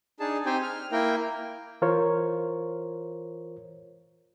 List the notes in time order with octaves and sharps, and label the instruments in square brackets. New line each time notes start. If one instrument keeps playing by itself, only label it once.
[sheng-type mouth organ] D4 D#4 G#4 A5
C4 D#4 G4 C5 G5 G#5
F6
A#3 E4 A#4 G5
[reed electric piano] E3 F4 A#4 C5 C#5